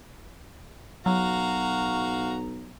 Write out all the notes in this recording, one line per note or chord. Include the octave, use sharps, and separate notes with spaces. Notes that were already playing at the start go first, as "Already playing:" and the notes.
B1 F#3 F#4 F5 A#5